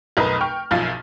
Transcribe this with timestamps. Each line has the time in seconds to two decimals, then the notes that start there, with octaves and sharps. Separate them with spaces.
0.17 F1 B1 A#4 B4 D#5
0.41 G5 C#6 F6
0.71 F#1 B1 F#2 F3 F5 A6